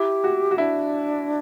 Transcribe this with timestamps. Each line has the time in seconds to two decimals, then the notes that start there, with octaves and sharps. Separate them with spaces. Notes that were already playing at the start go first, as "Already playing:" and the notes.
Already playing: E4 G4
0.24 F#4
0.51 F#4
0.58 D4 E4